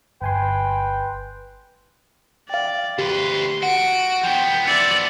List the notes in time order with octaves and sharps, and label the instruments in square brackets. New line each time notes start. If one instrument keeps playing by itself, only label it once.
[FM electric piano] G1 G#5 C6 [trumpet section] B4 G5
[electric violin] D5 [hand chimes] F5 G5
[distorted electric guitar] D2 B4 [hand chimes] G4 [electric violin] C6
[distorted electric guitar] F#4 [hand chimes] F#5 [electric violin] D7
[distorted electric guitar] F3 B3 [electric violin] G5
[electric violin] D5 E5 [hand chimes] C#7